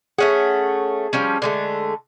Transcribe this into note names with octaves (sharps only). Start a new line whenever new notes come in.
A3 C#4 G#4 F#5
F3 G3 C#4
D3 G#3 A3